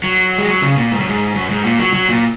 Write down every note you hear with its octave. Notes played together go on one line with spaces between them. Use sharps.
F#3
G#3
F#3
C#3
A#2
G#2
F#2
G#2
F#2
G#2
A#2
F#3
F#3
A#2